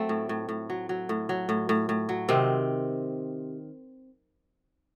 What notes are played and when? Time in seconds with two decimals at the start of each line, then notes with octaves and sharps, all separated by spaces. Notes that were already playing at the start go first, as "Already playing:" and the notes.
Already playing: F#3 A3 C4
0.09 A2
0.29 A2
0.49 A2
0.70 F#3
0.89 F#3
1.09 A2
1.29 F#3
1.49 A2
1.69 A2
1.89 A2
2.09 F#3
2.29 C3 D#3 C4